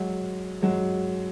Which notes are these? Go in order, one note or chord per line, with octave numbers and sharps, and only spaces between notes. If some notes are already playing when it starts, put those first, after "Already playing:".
Already playing: F#3 G#3
F#3 G#3